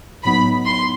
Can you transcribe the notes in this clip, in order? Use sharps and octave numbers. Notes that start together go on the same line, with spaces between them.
A2 F#3 B3 D#4 B5
C6